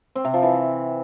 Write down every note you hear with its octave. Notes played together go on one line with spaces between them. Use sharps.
C4
C3
F3
E3